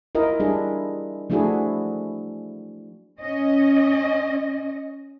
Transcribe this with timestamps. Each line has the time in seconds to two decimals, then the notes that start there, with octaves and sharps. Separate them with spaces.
0.15 E4 F4 A#4 D#5
0.40 G3 D4 E4 G#4
1.30 F3 A3 D4 E4 F#4 G#4
3.19 C#4 D#5